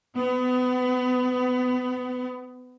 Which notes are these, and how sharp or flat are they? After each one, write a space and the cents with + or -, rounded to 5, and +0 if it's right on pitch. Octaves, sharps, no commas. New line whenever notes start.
B3 +30